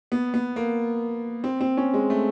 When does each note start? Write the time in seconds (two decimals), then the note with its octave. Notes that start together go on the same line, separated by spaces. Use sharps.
0.12 B3
0.34 B3
0.56 A#3
1.44 C4
1.61 C4
1.77 C#4
1.94 G#3
2.10 A3